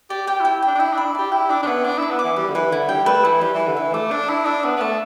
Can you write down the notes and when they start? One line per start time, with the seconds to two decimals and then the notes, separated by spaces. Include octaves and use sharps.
0.10 G4 D5
0.27 G4 G5
0.40 E4 G5
0.62 D4 G5
0.75 D4
0.80 E4 G5
0.93 D4 B5
1.06 E4
1.15 G4 D5
1.32 E4 G5
1.50 D4 D6
1.63 D4
1.67 B3 E4
1.84 D4 D6
1.98 E4 D6
2.10 B3
2.19 E3 D6
2.36 G3 B4
2.50 D3
2.54 E3 B4
2.71 D3 E4
2.89 G3 G5
3.06 A3 B4
3.24 E3 E4
3.41 G3 B4
3.54 E3
3.59 B4
3.67 D3
3.77 E3 E5
3.93 A3 D6
4.11 D4 A5
4.28 E4 A5
4.45 D4 E5
4.63 B3 E5
4.77 B3
4.81 A3 A5